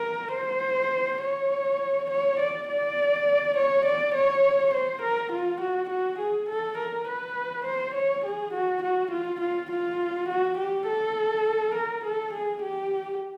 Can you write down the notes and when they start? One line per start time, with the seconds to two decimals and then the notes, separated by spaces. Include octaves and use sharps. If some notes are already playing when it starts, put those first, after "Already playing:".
Already playing: A#4
0.34 C5
1.22 C#5
2.10 C#5
2.40 D5
2.68 D5
3.57 C#5
3.85 D5
4.14 C#5
4.74 C5
5.02 A#4
5.32 F4
5.61 F#4
5.89 F#4
6.19 G#4
6.49 A4
6.78 A#4
7.08 B4
7.65 C5
7.94 C#5
8.24 G#4
8.54 F#4
8.83 F#4
9.11 F4
9.41 F4
9.71 F4
10.29 F#4
10.58 G4
10.87 A4
11.75 A#4
12.04 A4
12.33 G#4
12.62 G4